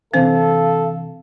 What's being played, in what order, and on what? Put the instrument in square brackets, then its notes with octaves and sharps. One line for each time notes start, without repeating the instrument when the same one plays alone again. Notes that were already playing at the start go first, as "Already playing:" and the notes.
[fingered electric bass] C3 E3 D4 [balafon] C4 C5 [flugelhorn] A4 [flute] F5